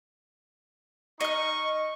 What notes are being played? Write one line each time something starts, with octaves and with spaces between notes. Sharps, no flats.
D#4 D#5 C#6 F6